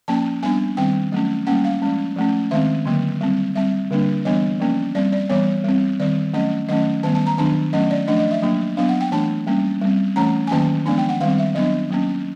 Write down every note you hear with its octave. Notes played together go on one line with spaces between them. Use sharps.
F3 A#3 C#4 A5
G3 B3 D4 G#5
D#3 G3 C4 G5
F#3 A3 C#4
G3 A#3 C#4 F#5
F5
F3 G#3 C#4
F3 A3 C#4
D#3 G#3 C4 E5
D3 F#3 A#3
G3 C4
G3 C4 E5
D3 G3 A#3 D4
E3 G3 B3 D4 D#5
F3 A#3 C#4
G3 C4 D5
D5
E3 G3 B3 C#5
G3 C4
D#3 G3 C4 D5
F#3 A3 C#4 D#5
D#3 F#3 A3 C#4 D#5
D#3 G3 B3 A5
A5
A#5
D#3 F#3 B3 D4 A5
F#3 A3 C#4 D#5
D5
F3 A3 D4 D#5
D#5
E5
F#3 A#3 D4
F#3 B3 D4 F5
F#5
G5
E3 A3 D4 A5
G3 A#3 C#4
G3 C4
E3 A3 C#4 A#5
G#5
D#3 F#3 A#3 C#4 A5
F3 G#3 B3 D4 G#5
G5
F#5
D#3 G3 C4 F5
E5
F#3 B3 D4 D#5
F#3 A#3 C#4